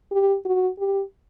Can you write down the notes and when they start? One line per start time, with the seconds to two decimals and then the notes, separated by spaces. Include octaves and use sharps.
0.12 G4
0.45 F#4
0.78 G4